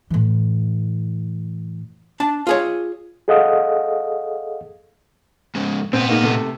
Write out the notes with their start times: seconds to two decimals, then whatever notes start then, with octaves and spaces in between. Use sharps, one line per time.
0.10 A2 E3
2.20 D4 A5
2.47 F4 G#4 C#5
3.28 G#4 A4 D#5 F5 F#5 D#6
5.55 G#2 C#3
5.93 A#2 B3 C4
6.09 G#3 A#3 D#4
6.23 C3 A3